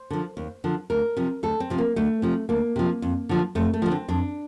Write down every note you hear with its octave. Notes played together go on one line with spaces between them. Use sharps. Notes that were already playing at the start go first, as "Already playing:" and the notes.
Already playing: C5
D3 F3
D#2
D3 F3
D2 A#4
C3 F3
D2 A4
C4
C3 F3
A#3
D2 A3
C3 F3
D2 A#3
C3 F3
F2
D3 F3
F2 A3
A3
D3 F3
C4
F2 D4